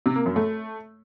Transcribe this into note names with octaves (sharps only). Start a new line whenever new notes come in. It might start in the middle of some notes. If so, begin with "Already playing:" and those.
C3
A#3
F#2
A3